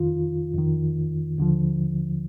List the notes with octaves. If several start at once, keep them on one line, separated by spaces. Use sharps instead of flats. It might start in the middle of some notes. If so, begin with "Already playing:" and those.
Already playing: F2 D#3 F4
F2 D#3
D#2 D3 F3